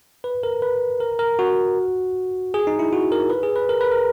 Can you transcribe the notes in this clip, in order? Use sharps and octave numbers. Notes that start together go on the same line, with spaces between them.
B4
A#4
B4
A#4
A#4
F#4
G#4
D#4
E4
F#4
A#4
B4
G#4
B4
A#4
B4
A#4